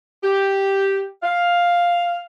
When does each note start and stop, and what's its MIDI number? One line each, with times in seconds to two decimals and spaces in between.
0.23 1.05 67
1.23 2.24 77